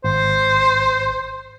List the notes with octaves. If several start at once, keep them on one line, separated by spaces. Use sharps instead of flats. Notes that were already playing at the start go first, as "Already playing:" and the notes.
G#1 C5